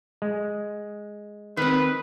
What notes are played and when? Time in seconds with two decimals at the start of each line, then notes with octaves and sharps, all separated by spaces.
0.22 G#3
1.57 D#3 C4 B4